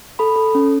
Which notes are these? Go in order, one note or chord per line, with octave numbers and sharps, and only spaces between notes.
A4 B5
A4
C#4